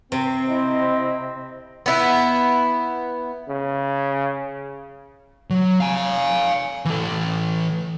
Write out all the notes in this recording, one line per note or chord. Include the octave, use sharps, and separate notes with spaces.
C3 C4
E4 C5 D#5
B3 E4
C#3
F#3
F5 G#5
E3 A4